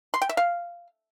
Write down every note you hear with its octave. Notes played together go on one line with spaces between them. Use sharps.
C6
G5
E5
F5